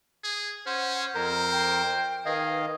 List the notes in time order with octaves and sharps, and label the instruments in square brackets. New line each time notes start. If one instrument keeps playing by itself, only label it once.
[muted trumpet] G#4
[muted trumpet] C#4 [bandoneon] C5 [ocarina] F#5
[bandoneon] F2 A#4 [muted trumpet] C5 [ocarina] A#5
[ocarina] G5
[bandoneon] D#3 D#5 F5 [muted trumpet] G#4 [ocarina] B4